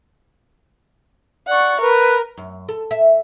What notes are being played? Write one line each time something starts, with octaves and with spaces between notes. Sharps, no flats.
D5 F#5 C#6
A#4 B4
F#2
A4
E5